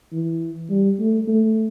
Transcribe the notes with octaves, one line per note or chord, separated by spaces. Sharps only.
E3
G3
A3
A3